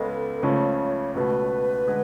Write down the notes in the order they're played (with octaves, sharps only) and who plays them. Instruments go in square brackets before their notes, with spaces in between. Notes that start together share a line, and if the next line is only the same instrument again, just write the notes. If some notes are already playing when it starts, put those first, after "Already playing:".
Already playing: [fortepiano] C#2 C#3 G#3 B3 [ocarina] A4
[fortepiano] C#2 C#3 F3 A3 [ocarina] C#5
[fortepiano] C#2 B2 A3 [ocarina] B4
[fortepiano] D3 G#3